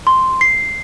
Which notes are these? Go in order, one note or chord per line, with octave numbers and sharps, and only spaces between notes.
C6
C7